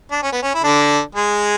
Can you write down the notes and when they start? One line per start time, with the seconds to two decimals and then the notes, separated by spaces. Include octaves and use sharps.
0.12 D4
0.23 C#4
0.32 B3
0.42 C#4
0.55 E4
0.63 D3 D4
1.15 G#3 G#4